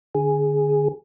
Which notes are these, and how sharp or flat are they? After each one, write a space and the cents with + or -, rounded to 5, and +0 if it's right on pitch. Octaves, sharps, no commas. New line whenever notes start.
D3 +10 G#4 +0